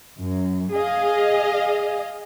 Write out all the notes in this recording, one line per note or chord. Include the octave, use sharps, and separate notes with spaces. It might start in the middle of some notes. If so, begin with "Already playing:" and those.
F#2
G#4 D#5 F5